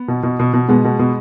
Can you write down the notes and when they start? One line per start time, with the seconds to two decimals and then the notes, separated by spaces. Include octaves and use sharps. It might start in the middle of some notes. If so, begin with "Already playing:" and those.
Already playing: B3
0.08 B2
0.23 B2
0.39 B2
0.53 B2
0.69 B2 G#3 B3
0.84 B2
0.99 B2